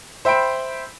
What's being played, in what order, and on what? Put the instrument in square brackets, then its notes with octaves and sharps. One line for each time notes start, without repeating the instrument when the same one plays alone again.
[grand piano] C5 E5 G5 B5 D7